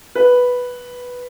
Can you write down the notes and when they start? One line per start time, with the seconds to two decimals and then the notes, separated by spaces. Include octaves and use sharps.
0.15 B4